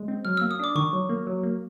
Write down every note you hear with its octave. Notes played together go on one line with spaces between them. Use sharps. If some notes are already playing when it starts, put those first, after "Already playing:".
Already playing: G#3
C4
F#3 F6
A#3 E6
D#6
D4 D6
D#3 C#6
F#3
A#3
F#3
A#3